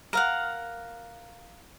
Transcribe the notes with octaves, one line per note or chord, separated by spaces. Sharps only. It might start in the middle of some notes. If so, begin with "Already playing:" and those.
A#4 F5 F#5